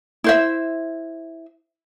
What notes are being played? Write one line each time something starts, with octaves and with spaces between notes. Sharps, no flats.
E4 C5 E5